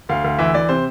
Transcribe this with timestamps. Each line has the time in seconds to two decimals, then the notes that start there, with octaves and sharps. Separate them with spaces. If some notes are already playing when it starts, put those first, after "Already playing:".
0.09 D2 F5
0.24 D2
0.38 E3 E5
0.54 E3 D5
0.69 C3 C5